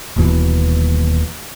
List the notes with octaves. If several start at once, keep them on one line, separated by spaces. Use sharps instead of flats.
D#1 D#2 B2 E3